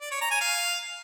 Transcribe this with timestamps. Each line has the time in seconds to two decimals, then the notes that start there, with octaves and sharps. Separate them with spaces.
0.01 D5
0.11 C#5
0.21 A#5
0.31 G#5
0.41 F5